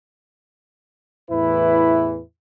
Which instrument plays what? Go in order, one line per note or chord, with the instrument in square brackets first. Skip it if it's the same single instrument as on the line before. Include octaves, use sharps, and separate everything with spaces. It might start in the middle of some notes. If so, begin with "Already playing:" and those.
[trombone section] E2 A2 E3 E4 B4